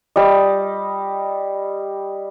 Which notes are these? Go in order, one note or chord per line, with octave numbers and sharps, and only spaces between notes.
G3 D#5